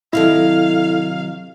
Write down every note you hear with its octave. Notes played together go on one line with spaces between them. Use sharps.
C3 D#3 F#3 E4 A4 F5